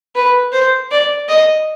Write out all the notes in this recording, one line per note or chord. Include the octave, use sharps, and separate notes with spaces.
B4
C5
D5
D#5